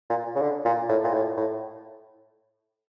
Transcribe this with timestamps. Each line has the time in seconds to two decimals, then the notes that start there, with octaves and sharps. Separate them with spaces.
0.10 A#2
0.36 C#3
0.42 D3
0.65 A#2
0.89 A2
1.04 A#2
1.14 A2
1.37 A2